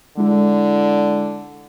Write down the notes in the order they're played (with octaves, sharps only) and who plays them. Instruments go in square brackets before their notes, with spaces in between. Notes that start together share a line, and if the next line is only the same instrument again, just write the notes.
[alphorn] D3 [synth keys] G#3 E4